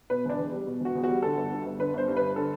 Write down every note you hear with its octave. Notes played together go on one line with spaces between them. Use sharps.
B2 B4
E1 D4
E2
G3
B2
E1 F#4
E2
G3 F#4
D3 A4
G1
G2
G1
D3 B4
G1 C5
G2
G1 B4
D3 A4